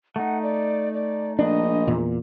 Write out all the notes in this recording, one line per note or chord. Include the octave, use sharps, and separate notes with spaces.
A3 D#4 F#5
D5
D5
A#1 D4 D#5
E2 A#2